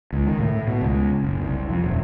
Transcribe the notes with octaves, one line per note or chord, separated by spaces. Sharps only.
C#2
D#3
A2
B2
C#2
F#1
C2
F2
D#1